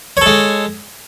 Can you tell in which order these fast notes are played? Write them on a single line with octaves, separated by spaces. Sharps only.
C#5 A4 G#3